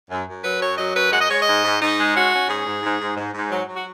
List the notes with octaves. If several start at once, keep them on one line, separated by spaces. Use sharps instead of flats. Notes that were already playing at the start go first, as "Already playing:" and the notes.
F#2
F#2
F#3 B4
F#2 C#5
F#3 D#5
F#2 B4
G#3 F#5
D#5
G#3 C#5
D#5
G#2
G#2
G#2 D#4
G#3
C#4 F#4
C#4
G#2 G#4
G#2
G#2
G#2
G#2
G#2
F#3
F#3
F#4